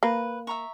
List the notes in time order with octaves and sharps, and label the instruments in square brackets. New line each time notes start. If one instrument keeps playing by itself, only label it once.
[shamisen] A#3 [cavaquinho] B4
[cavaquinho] E5 A#5 C#6